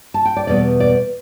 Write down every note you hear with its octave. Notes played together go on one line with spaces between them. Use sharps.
A5
G5
D5
E2 B2 G3 B3 D5
D5